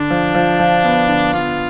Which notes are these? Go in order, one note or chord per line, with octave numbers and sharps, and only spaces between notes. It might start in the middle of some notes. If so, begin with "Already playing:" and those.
Already playing: D3 D4
F3
F3
F3
B3
D3
B3 F4